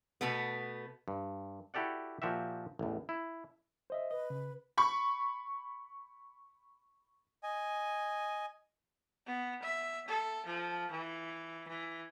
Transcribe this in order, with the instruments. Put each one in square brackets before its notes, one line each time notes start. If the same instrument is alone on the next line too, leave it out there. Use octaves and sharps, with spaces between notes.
[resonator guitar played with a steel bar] B2 A3 B3
[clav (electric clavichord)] G2
E4 F#4 G4 A4 D5 F#5
A#2 F3 F#4 G4 E5
A1 E2
E4
[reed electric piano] C5 D#5 E5
[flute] B4 [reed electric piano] D#5
[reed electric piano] C#3
[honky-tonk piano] B5 C#6
[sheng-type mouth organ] D#5 G#5
[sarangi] B3
E5
A4
F3
E3
E3